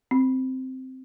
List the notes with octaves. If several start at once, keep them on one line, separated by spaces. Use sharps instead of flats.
C4